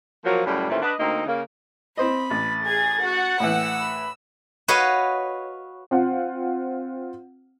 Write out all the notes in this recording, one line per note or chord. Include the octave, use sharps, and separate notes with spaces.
F3 F#3 A#3
F#2 A2 C#3 G3
D#2 A#2 E3 A3 C4 C#4
D4 B4 D#5
D2 A#3 C4 D#4
C#3 A#3
C4 C5 D#5 B5
A1 A6
G#4 G#6
F#4 F#5
A2 E3 G5 E6
B5
F#4 B4 C#5 D#5 F5
C4 F4 F#5